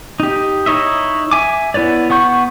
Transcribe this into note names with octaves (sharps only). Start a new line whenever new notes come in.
D#4 G4
D#4 E4 C#5 D#5 E5
E5 G#5 D6
B3 E4 B4 C#5 D5
B3 F#5 C#6 G6